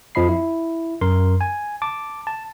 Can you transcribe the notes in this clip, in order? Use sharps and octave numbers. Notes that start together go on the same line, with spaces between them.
F2 F3 D#5 B5 C7
E4
F#2 A#4 C6
G#5
A5 D6
A5